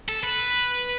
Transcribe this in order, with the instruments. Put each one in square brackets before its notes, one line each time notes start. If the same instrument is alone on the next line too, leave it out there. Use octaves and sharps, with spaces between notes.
[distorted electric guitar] A4
B4